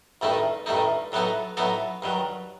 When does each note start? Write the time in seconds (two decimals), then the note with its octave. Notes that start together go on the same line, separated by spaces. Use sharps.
0.21 A1 G2 D#3 A3 D#4
0.66 A1 G2 D#3 A3 D#4
1.12 A2 F#3 B3 D#4 A4
1.57 A2 F#3 B3 D#4 A4
2.02 G2 D#3 F#3